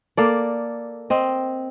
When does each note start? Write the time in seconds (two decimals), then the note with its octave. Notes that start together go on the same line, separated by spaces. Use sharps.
0.17 A#3 A4 D5
1.10 C4 D#5